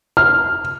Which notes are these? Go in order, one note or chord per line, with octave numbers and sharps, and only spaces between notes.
F6